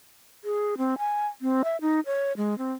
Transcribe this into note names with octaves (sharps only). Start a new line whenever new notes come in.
G#4
C4
G#5
C4
E5
D#4
C#5
G#3
C4